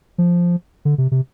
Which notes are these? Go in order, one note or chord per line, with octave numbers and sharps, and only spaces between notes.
F3
D3
C3
C3